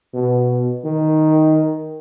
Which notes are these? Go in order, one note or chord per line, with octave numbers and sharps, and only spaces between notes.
B2
D#3